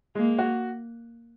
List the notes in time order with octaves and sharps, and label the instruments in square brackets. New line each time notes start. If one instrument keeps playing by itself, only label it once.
[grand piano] G#3 [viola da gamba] A#3
[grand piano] F#4